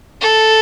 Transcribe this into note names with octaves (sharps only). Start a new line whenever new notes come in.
A4